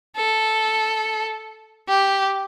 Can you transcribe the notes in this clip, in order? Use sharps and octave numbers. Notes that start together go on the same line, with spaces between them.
A4
G4